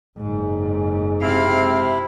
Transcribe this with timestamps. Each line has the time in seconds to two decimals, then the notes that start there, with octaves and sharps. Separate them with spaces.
0.18 F#1 G#2 G#3
1.22 C3 C4 E4 F5